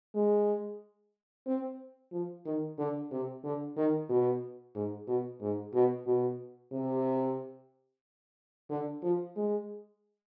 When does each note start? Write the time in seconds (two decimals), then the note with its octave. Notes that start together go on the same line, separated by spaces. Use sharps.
0.15 G#3
1.47 C4
2.12 F3
2.45 D#3
2.79 D3
3.11 C3
3.44 D3
3.77 D#3
4.09 B2
4.75 G#2
5.08 B2
5.41 G#2
5.74 B2
6.07 B2
6.72 C3
8.70 D3
9.03 F3
9.36 G#3